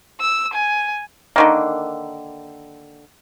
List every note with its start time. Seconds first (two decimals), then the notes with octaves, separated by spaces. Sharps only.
0.21 E6
0.54 G#5
1.36 D3 D#3 A#3